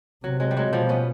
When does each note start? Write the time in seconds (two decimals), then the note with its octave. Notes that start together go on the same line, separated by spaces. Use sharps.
0.23 C3 F#3
0.40 F#3 G#3
0.51 G3
0.57 F#3 G#3
0.73 B2 F3 G3
0.89 B3 C#4